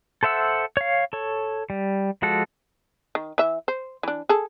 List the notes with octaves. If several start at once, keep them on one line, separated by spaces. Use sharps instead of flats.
A4 C5 E5 F#5 E6
C#5 F5
A4 C#5
G3
F3 G#3 F#4 A4
D#3
E3 E5
C5
E3 D4
G#4 A4